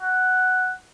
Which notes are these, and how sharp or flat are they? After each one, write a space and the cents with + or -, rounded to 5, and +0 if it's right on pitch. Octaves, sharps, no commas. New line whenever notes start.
F#5 +0